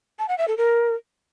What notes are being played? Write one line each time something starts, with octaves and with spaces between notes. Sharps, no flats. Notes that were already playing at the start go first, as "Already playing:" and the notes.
A5
F#5
E5
A4
A#4